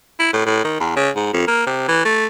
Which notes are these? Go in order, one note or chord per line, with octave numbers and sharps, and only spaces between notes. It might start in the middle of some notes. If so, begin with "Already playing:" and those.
E4
A2
A2
D#3
E2
C#3
G#2
F2
A#3
C3
E3
A3